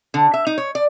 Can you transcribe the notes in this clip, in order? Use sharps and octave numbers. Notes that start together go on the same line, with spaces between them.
D3
E5
D#4
C#5
D5